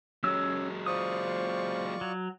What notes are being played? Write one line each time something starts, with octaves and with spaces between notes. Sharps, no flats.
F#3 G#3 C#4 C#5 E6
F4 C5 D5 C#6 D#6
F#3